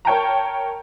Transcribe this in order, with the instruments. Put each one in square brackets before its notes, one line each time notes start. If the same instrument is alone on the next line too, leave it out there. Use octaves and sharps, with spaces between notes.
[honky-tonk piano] A#4 C#5 G5 A5 A#5